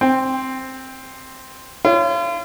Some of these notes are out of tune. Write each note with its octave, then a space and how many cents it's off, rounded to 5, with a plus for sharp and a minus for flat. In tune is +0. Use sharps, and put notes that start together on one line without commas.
C4 +5 G5 +15
F4 -40 C#5 +0